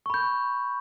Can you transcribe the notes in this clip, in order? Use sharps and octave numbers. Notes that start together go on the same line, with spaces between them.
B5 C#6 G6